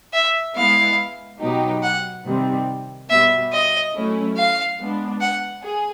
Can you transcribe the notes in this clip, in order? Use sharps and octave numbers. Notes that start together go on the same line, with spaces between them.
E5
G#3 B3 E4 F5
B2 F#3 B3 D#4 G4
F#5
C3 D#3 G3 C4
B2 G3 B3 E5
D#5
F#3 A3 C#4 E4
F5
G#3 B3 D4
F#5
G#4